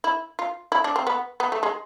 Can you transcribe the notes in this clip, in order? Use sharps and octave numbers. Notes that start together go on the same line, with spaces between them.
E4
F4
E4
D4
C4
B3
B3
A3
G#3